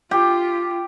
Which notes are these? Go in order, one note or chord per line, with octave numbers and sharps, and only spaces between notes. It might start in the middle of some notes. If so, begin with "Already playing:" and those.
F4 G4